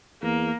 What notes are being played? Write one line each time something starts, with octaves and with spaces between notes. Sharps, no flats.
E2 A#3